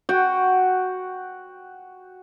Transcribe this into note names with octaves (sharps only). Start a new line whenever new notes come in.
F#4 F#5 G5